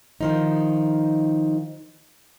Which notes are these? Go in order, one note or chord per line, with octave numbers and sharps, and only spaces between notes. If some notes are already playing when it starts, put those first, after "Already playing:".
D#3 F3 D#4